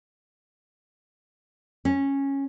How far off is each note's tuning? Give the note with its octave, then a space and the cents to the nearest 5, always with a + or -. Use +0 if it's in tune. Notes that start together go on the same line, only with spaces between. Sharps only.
C#4 -10